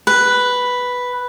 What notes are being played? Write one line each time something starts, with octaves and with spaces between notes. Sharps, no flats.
B4